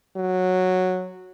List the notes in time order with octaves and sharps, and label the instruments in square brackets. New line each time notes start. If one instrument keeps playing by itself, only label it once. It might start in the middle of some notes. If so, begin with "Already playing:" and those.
[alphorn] F#3